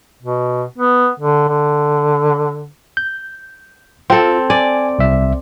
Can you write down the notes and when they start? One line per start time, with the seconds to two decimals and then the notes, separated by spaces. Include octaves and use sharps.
0.22 B2
0.78 B3
1.20 D3
1.49 D3
2.97 G6
4.10 C4 F4 A4
4.50 D5 G#5
4.99 C2 E5